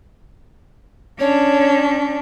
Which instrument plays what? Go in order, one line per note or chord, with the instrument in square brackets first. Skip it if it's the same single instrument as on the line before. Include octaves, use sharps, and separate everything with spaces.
[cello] C#4 D4 [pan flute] C#5